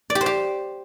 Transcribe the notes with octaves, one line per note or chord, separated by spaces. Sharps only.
D5
G4
C5
G4